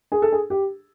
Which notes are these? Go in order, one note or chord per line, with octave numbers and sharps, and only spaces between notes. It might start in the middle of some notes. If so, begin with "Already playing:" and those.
G#4
A4
G#4
G4